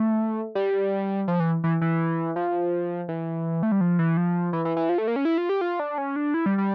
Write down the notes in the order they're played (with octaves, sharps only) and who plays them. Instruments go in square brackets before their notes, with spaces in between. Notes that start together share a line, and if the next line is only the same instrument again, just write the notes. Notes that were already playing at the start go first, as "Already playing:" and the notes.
Already playing: [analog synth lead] A3
G3
F3
E3
E3
E3
F3
E3
A3
G3
F3
E3
F3
E3
E3
E3
F3
A3
A#3
C#4
E4
F4
G4
F4
D4
C#4
D4
E4
G3
G3